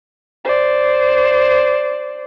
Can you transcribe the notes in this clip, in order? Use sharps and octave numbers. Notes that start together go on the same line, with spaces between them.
C5 D5